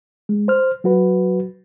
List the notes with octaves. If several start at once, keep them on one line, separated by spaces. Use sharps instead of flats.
G#3
C5 F6
F#3 F#4 B4